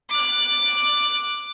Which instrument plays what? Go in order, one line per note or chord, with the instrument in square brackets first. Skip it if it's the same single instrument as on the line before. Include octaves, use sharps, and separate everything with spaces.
[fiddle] D6 F#6